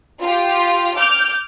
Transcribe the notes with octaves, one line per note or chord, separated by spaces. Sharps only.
F4 G4
D6 F6 G6